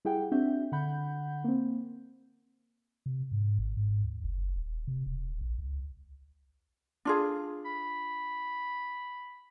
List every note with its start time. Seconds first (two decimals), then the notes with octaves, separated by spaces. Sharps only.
0.05 G3 E4 G4 G#4 F#5 G5
0.32 C4 D4 F#4 E5 G6
0.72 D3 F#5 B5 G6
1.44 A#3 C4
3.06 C3
3.32 G#2
3.59 G#1
3.77 G#2
4.05 D2
4.24 F#1
4.56 D#1
4.87 C3
5.06 D#1
5.41 A#1
5.58 C#2
7.05 D4 F4 G#4
7.65 B5